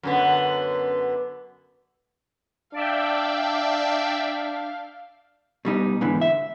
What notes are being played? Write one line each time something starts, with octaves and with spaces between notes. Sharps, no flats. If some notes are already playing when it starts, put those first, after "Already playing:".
F#2 D3 B3
D4 D5 E5 F5 G5
B2 G3 D#4
G#2 D3 E3 B3
E5